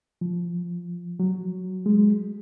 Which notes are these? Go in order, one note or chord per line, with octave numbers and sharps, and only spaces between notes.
F3
F#3
G#3